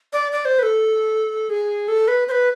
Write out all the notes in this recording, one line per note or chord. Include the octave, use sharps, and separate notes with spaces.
D5
D5
C5
B4
A4
G#4
A4
B4
C5
B4